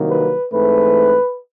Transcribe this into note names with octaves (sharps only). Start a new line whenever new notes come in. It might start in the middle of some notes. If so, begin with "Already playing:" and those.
Already playing: C2 C3 D#3 F#3 A#3
B4
G#2 E3 A3 C4 B4